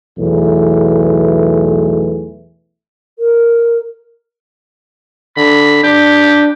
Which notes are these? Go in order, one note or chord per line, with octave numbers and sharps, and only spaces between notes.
B1 E2 E3 A3
A#4
D3 B5
D4 G4